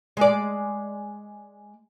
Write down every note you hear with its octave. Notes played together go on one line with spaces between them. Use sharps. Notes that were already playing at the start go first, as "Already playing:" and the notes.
G#3 D5